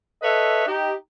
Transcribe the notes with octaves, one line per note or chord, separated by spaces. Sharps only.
A4 B4 C#5 D#5 E5
D#4 G4